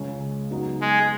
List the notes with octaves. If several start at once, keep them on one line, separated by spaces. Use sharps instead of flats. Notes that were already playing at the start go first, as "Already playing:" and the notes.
Already playing: C#2 C#3 G#3 C#4
C#3 F#3 B3 D#4 F#4
G#3